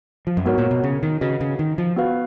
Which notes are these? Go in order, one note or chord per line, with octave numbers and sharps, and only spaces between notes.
F3
F#2
G#2 B3 F#4 A#4 C#5
A#2
B2
C#3
D#3
C#3 F#4 B4 D#5
C#3
D#3
F3
B3 F#4 B4 F5